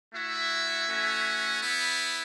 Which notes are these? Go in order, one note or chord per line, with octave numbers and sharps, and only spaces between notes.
A3 E4 F#4 E5
A3 C#4 F#4
B3 E4